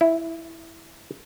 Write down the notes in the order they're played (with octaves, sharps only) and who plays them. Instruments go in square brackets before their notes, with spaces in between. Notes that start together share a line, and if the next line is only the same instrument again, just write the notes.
[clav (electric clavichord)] E4